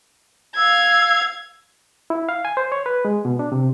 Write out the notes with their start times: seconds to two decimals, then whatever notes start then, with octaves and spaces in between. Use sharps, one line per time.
0.56 F5 E6 G#6
2.10 E4
2.29 F5
2.45 G#5
2.57 C5
2.72 C#5
2.86 B4
3.05 G#3
3.25 B2
3.39 D4
3.52 C3